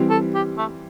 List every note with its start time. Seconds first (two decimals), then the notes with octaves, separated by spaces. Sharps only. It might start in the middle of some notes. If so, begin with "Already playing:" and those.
Already playing: E3 G3 C4
0.10 A4
0.34 G4
0.57 A3